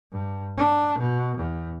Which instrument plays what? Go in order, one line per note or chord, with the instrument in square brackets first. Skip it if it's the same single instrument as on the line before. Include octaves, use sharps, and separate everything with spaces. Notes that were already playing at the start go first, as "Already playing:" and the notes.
[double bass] G2
D4
B2
E2